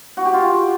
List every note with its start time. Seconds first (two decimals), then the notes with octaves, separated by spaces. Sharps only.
0.17 F#4
0.25 G4
0.33 F4